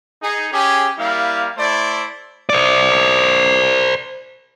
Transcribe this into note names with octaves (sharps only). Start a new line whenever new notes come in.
D#4 G#4
C#4 G4 G#4
G3 A#3 E4 F5
A3 E4 C5 D5
C5 D5